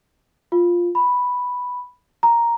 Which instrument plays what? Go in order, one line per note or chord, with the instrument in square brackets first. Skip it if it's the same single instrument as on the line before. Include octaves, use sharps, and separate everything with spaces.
[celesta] F4
B5
A#5